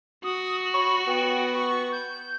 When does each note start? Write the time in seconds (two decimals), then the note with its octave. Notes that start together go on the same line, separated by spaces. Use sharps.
0.24 F#4 D#6
0.74 C#5 B5
1.08 B3 G5
1.53 C#6
1.92 G6